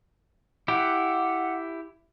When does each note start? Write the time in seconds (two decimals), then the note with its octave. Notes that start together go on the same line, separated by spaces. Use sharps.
0.68 E4 G4 F#5